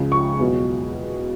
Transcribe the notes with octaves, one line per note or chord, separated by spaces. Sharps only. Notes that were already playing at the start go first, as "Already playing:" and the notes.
Already playing: C#2 C#3 F3
C#6
E2 B2 F#3